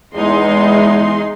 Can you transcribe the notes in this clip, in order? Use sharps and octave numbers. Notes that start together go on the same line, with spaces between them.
E2 G#3 D#4 C6